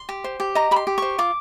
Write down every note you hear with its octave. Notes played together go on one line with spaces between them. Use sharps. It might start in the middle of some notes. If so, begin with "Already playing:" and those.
Already playing: C6
G4
C5
G4
D#5 A#5
G4 B5
C6
G4
C5 C#6
F4 D6